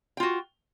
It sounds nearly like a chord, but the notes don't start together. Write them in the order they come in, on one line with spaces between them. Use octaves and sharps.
G5 F4 F#4